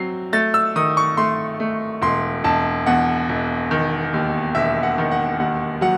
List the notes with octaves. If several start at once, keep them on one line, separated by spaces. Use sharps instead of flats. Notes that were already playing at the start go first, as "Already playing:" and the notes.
Already playing: F#3 C4 C7
A3 A6
E6
D#3 D#6
C#6
A3 C6
A3
E1 C6
E1 A5
E2 F#5
E1
D#3
D#2
E1 E5
F#5
D#3
F#5
D#2 F#5
F#3 F#5